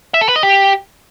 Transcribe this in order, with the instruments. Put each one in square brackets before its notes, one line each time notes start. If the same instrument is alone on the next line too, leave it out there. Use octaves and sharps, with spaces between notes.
[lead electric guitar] E5
A4
B4
D#5
G4